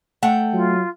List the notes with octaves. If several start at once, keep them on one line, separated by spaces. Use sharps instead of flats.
A3 F#5 G5
F#3 F4